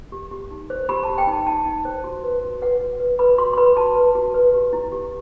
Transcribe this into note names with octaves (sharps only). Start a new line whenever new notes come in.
G4
G4
D#4
C5
G4 B5
G4 A5
G5
D#4 A5
D#4 A5
D#4
C5
F#4
B4
F#4
B4 F#5
F#4
B4
B4 B5
F#4 C6
C6
B4 B5
F#4 A5
B4
F#4
B4
G4
E4
G4